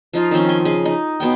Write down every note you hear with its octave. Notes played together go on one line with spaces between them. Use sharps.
F3 D#4 F4
D#3 F3 C4 C#4
G#5 C6
C#3 D#5
D#4
B2 B3 C#5 G5